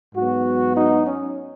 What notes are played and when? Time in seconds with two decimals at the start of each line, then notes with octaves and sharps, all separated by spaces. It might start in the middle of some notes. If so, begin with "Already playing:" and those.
0.15 G#2 F#3 B3 F#4
0.76 D#4
1.07 C#4